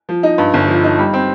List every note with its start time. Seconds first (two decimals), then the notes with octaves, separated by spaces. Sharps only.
0.09 F3
0.23 D#4
0.38 G2
0.54 G1
0.68 F3
0.84 D#4
0.99 G3
1.14 C4